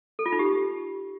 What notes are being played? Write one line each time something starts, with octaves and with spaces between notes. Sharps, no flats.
A4
F4
D#4
G4